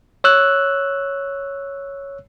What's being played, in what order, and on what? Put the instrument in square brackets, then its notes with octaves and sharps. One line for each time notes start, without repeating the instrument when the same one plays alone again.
[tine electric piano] C#5 E6 F#6